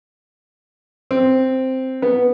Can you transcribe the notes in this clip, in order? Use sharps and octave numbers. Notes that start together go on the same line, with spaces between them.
C4
B3